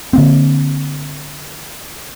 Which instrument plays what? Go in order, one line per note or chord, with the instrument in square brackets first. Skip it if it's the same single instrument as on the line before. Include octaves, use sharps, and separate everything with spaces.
[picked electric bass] D3 A#3 C4